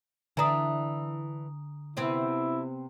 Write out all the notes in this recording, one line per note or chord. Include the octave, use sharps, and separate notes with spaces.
D3 E3 D4 G#5 A#5 D#6
C3 B3 C4 E4